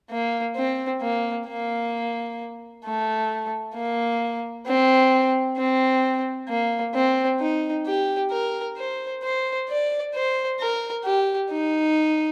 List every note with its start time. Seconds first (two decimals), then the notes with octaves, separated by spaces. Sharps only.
0.11 A#3
0.56 C4
1.01 A#3
1.47 A#3
2.85 A3
3.75 A#3
4.67 C4
5.57 C4
6.49 A#3
6.94 C4
7.40 D#4
7.87 G4
8.31 A#4
8.77 C5
9.23 C5
9.69 D5
10.14 C5
10.60 A#4
11.05 G4
11.52 D#4